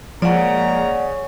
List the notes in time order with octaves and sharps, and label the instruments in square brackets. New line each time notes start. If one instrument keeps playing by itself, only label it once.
[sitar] C#3 [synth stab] F3 [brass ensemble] G#3 A#3 A#5 [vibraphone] D5 F#5